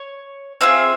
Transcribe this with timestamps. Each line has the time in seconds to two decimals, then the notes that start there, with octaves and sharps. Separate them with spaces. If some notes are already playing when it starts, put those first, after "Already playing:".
Already playing: C#5
0.61 C4 F4 G#4 E5 E6